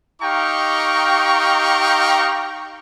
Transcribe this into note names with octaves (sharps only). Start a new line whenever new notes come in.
D#4 G4 F5 G5 A#5 C#6